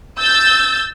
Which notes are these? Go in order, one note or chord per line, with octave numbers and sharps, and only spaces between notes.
E6 G6 A6